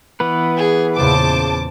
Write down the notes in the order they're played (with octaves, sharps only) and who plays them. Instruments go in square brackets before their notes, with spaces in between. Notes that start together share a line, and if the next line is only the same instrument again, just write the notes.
[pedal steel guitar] E3 B3 B4
[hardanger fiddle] G#4
[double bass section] E2 A#2 C#3 [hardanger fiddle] C5 [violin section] A5 D6